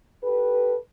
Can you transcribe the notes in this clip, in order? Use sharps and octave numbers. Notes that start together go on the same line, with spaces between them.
G4 A4 B4